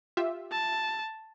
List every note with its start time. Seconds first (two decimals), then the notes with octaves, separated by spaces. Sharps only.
0.17 F4 G4 E5
0.51 A5